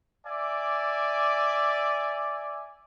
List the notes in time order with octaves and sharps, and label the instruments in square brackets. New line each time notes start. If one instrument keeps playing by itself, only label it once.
[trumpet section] D5 E5 G#5 D6